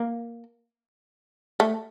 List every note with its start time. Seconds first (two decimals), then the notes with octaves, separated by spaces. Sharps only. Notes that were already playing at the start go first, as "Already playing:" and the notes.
Already playing: A#3
1.60 A3